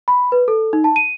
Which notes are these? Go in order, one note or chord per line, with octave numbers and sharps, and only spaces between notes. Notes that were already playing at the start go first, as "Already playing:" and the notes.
B5
B4
A4
D#4
A5
D#7